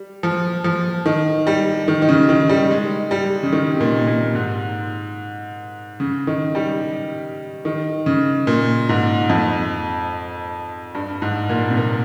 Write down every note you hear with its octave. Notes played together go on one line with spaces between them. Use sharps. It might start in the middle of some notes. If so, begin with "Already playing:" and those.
Already playing: G3
F3
F3
D#3
G3
D#3
D#3
C#3
D#3
G3
G#3
G3
C#3
D#3
C3
A#2
A#2
G#2
C#3
D#3
G3
D#3
C#3
A#2
G#2
F2
G2
G#2
A#2
C3
A#2